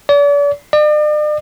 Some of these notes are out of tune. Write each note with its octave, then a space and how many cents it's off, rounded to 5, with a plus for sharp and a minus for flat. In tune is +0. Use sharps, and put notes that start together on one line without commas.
D5 -40
D5 +45